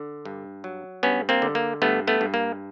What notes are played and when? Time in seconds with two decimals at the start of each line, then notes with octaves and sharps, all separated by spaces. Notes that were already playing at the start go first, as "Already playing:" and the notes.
Already playing: D3
0.25 G2
0.64 F#3
1.03 G2 B3 C#4
1.29 A#3 C4
1.42 D3
1.55 A#3
1.82 G2 A3 B3
2.07 A3 B3
2.21 G2
2.34 A#3